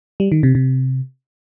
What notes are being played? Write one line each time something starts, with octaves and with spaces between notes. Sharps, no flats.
G3
D#3
C3
C3